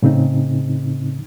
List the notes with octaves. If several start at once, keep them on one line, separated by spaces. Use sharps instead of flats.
A2 C#3 C4 D#4